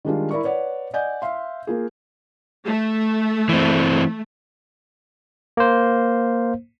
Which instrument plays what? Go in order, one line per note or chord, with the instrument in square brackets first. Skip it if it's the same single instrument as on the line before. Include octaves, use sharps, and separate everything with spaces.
[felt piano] D#3 G3 G#3 D4 F4
E4 A#4 D5 C#6
B4 C#5 D5 F#5
D5 D#5 F#5 G#5 G6
E5 F5 C6
A#3 F4 G#4
[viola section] A3
[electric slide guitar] E3 C4
[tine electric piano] A#3 C5